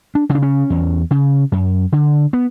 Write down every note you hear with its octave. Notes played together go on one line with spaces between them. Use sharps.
D4
C#3
D4
C#4
E2
C#3
F#2
D3
B3